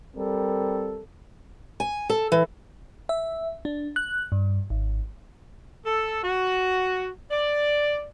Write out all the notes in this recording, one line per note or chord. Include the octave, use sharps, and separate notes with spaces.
G3 C4 A4 A#4
G#5
A4
E3
E5
D4
F#6
G2
G#1
A4
F#4
D5